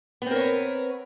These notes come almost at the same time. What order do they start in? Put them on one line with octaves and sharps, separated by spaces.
B3 C4 A#4 C#5 B4